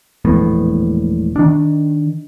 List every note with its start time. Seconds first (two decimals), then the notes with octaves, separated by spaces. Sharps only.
0.25 E1 A#1 A2 B3
1.36 D#3 D4